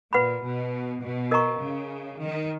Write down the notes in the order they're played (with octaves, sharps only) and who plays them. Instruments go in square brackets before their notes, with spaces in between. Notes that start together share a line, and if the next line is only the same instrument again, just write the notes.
[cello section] A#2 [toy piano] B4 F#5 B5
[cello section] B2
B2
[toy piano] A#4 D#5 A#5 C#6
[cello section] C#3
D#3